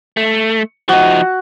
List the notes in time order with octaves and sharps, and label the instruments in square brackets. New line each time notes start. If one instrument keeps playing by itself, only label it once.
[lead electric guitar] A3
[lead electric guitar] F3 D#4 [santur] F#4